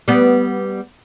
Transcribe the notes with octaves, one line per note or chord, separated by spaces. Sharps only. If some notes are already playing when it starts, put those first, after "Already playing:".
G3 B3